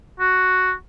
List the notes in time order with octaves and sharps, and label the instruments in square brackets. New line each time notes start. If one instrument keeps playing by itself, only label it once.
[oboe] F#4